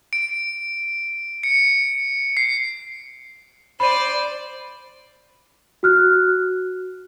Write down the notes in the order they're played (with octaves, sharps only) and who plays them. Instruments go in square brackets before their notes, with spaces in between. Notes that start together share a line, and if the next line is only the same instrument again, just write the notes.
[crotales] D7
C#7
C7
[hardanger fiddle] C5 D5 [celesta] B5 D#7
[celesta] F#4 F6 F#6